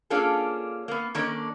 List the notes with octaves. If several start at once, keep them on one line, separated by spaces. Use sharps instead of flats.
A#3 C#4 D4 F4 G#4 A4
A#3 B3
D#3 A#3 C#4 D4 A4